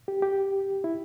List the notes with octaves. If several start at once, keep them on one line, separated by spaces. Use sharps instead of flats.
G4
G4
E4